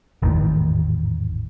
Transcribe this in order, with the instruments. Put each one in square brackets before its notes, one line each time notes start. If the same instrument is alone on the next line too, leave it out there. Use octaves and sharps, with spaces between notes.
[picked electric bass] G#1 E2 A2 D#3